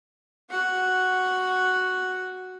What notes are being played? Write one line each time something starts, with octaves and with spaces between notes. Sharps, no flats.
F#4 F#5